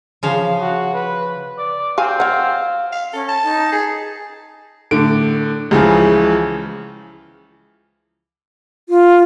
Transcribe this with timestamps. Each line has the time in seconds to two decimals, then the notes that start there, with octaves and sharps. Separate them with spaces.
0.23 C#3 F3 F5
0.60 F#4
0.94 B4
1.58 D5
1.98 C4 A#4 F5 G#5
2.20 C#5 F5 F#5
2.92 F5
3.13 C#4 A4
3.29 A5
3.43 D#4
3.72 G#4
4.91 A2 D3 D7
5.71 C#2 C#3 E3 F3
8.89 F4